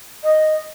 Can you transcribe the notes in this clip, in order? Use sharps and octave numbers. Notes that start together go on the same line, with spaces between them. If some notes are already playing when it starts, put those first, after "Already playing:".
D#5